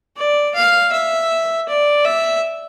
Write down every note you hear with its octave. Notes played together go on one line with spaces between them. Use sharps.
D5
F5
E5
D5
E5